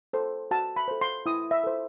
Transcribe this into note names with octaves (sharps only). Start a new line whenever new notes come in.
A4 C5
F#4 A5
B5
A4 C5
C6
E4 D#6
E5
A4 C5